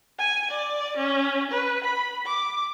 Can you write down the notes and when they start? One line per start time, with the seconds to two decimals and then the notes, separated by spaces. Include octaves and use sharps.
0.19 G#5
0.51 D5
0.97 C#4
1.51 B4
1.84 B5
2.26 D6